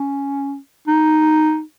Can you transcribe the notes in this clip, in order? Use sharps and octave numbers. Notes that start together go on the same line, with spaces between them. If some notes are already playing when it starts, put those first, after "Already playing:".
Already playing: C#4
D#4